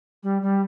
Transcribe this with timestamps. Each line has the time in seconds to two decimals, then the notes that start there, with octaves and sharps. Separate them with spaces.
0.23 G3
0.42 G3